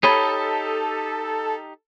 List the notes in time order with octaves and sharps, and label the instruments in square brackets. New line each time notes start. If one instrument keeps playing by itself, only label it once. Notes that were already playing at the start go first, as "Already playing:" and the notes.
[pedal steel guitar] D#4 G4 D#5 [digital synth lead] A4 [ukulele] C#5 B5